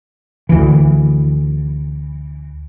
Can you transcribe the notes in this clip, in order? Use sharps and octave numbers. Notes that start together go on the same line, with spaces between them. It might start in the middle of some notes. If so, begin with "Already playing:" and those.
D2 E3